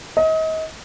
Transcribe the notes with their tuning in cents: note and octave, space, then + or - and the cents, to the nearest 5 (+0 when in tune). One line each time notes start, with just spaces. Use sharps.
D#5 +35